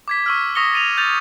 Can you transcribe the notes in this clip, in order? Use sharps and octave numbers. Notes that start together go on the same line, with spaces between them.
D6 G#6 B6
C#6 E6 F6
C#6 D#6 A#6 B6 C#7 G7
A6 D#7 F7
G6 A6 F7